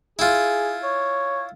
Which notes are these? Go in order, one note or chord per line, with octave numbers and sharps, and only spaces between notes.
E4 F4 G#4
C#5